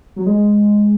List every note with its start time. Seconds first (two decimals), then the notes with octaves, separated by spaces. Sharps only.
0.16 F#3
0.26 G#3